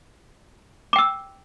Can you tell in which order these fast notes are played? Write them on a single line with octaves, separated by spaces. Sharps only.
D6 G5 E6